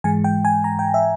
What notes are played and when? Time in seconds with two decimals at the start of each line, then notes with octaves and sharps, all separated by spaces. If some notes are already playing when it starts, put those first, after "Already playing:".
0.04 G#2 E3 G#3 G#5
0.24 G5
0.45 G#5
0.64 A#5
0.79 G5
0.94 E5